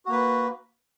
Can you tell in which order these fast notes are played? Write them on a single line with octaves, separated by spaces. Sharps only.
F#4 A#3 B4